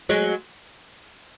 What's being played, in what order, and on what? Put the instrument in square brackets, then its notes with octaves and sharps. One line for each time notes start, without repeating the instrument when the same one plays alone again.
[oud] F#3 G#3